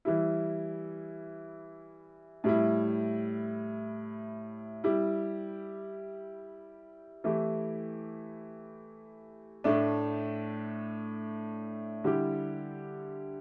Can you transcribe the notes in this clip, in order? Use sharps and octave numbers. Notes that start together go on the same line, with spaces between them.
E3 G3 E4
A2 G3 E4
G3 E4 G4
E3 A3 E4 G4
A2 A3 D4
D3 G3 E4 G4